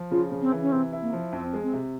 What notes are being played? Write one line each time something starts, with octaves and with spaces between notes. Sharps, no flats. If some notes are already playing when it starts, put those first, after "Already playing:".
Already playing: F3
C#3 F4
C#3
C4
E3
C#4
C3 C4
E4
A#3
F3
F2 C4
G#3
C4
C3